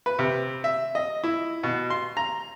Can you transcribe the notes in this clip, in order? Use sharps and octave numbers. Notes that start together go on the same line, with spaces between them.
B4
C3
E5
D#5
E4
B2
C6
A#5